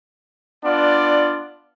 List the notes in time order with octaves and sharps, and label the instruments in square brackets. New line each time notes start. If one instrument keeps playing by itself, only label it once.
[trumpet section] B3 D4 F4 D5